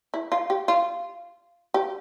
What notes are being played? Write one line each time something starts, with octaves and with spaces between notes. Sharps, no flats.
E4
F4
G4
F4
G4